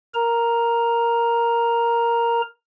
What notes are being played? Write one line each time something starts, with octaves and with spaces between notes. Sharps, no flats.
A#4 A#5